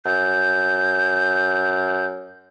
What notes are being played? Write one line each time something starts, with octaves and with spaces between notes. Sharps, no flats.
F#2 G6